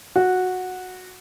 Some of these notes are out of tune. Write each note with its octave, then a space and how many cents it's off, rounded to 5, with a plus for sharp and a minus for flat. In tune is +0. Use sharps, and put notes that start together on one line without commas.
F#4 -10